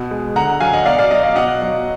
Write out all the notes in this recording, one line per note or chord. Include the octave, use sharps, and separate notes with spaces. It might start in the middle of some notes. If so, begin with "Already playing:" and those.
Already playing: B2
G#3
D3 F#5 A#5
F#3 F5 G#5
D#5 F#5
B2 D5 F5
D5 F5
F#3 D#5
D5 F5
B2 D#5 F#5
F#3